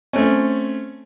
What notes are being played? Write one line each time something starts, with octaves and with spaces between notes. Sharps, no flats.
A3 C4 C#4